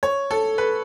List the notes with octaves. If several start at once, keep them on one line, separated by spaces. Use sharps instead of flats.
C#5
A4
B4